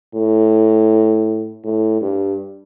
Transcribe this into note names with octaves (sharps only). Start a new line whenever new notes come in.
A2
A2
G2